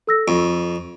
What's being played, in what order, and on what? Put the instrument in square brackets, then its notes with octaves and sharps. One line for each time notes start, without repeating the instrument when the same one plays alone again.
[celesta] A4 E6 A#6
[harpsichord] F2 [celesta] C#6